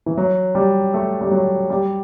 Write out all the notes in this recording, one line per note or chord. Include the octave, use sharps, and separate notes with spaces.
E3
F#3
G3
A3
G3
F#3
G3